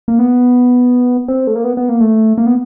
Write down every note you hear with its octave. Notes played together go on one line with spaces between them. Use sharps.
A#3
B3
C4
A3
A#3
B3
B3
A#3
A3
A#3
B3